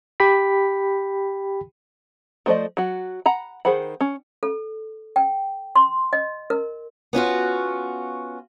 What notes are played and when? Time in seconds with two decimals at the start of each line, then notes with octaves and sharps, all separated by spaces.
0.20 G4 G5 B5 B6
2.46 F3 A3 C5 D5 D#5
2.77 F#3 F#4
3.26 F#5 A#5 B5
3.65 D#3 G#4 C5 F#5 B5
4.01 C#4
4.43 A4
5.16 G5
5.76 C6
6.13 D#5
6.50 A#4
7.13 B3 C#4 F4 F#4